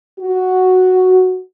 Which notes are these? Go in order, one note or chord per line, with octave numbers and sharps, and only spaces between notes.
F#4